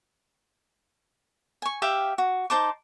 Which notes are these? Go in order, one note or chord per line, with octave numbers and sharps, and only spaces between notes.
G#5 C#6
G4 E5 F5 G5
F#4
D#4 C5 A5 D6